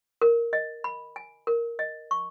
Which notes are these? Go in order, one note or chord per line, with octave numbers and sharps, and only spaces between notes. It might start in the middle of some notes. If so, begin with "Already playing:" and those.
A#4
D#5
B5
G#5
A#4
D#5
C#6